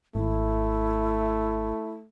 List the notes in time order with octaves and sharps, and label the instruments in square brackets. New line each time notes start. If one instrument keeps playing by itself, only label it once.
[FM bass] G#1 [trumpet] A3 [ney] E4